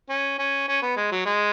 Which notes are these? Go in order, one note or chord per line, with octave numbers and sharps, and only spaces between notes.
C#4
C#4
C#4
B3
G#3
F#3
G#3